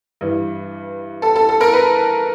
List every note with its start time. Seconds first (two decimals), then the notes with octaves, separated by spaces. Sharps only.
0.21 G2 E3
1.22 A4
1.36 A4
1.49 A4
1.61 A#4
1.73 B4